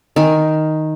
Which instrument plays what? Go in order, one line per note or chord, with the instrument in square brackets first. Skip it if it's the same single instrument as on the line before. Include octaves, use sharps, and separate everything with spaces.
[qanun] D#3 G#5